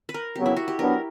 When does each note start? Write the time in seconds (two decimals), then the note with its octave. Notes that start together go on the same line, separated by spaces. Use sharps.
0.09 B4
0.14 A#4
0.35 C#3 F#3 B3 G4
0.46 E4
0.56 F#4
0.68 G4
0.78 F#3 B3 D4 A#4